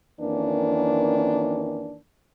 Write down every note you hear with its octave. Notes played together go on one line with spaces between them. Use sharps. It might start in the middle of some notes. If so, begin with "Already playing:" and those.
F2 D#3 E3 A#3 C#4 D4